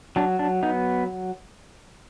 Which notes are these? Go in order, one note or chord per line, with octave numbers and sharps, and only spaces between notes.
F#3 D4
D4
B3 D#4